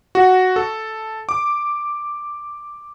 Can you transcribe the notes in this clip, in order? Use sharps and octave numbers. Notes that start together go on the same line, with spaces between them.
F#4
A4
D6